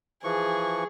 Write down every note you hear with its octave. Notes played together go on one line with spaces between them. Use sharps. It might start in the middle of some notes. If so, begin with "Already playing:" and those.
E3 F3 G#4 C#6